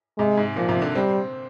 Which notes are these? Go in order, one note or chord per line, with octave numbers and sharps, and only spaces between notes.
C3 G#3
G#2
A#2 F3
C3
D3
G3 C4